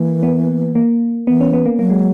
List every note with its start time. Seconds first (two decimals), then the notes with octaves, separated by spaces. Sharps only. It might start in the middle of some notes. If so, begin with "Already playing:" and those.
Already playing: E3 A#3
0.23 B3
0.75 A#3
1.27 E3 B3
1.41 C#4
1.53 B3
1.66 A#3
1.79 F#3 A#3
1.90 G#3